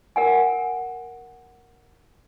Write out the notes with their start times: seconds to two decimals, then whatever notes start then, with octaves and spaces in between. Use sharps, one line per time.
0.16 A#4 F#5 G#5